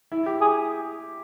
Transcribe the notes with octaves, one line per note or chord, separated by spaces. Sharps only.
E4
G4
G#4